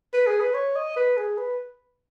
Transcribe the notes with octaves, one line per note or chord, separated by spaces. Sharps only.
B4
G#4
B4
C#5
D#5
B4
G#4
B4